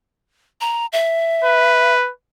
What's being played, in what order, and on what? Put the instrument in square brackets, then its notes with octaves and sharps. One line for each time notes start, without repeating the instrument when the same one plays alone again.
[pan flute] A#5
E5
[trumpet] B4